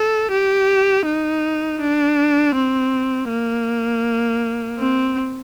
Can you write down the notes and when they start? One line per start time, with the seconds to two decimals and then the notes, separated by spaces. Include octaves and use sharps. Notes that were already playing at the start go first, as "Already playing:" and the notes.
Already playing: A4
0.31 G4
1.05 D#4
1.81 D4
2.55 C4
3.30 A#3
4.79 C4